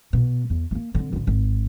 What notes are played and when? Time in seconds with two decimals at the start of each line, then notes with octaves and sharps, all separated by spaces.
0.13 B2
0.50 E2
0.71 A3 A#3
0.94 D3 C4
1.13 A1 D3
1.27 G#1